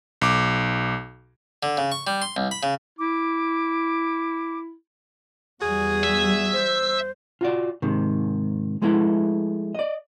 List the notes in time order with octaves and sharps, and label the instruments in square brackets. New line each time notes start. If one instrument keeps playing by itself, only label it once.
[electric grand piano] B1 D6
[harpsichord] D3
C#3
C#6
G3
C6
C2
B5
C#3
[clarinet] E4 [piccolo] D6
[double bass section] E2 G3 [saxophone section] F#4 G#4
[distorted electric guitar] E5
[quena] C5
[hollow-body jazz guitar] F4 F#4 D5
G#2 C3 D#3
F3 G#3 A3 B3 E4
D5 D#5